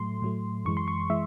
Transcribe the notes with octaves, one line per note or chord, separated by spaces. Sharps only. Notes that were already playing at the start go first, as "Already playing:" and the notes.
Already playing: A2 F#3 A3 C6
A2 F#3 A3
F#2 E3 G#3 C#6
C6
C#6
E3 G#3 E5